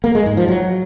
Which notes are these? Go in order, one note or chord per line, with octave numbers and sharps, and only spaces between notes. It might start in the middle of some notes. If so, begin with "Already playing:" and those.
A#3
G#3
G#2
F3
F#3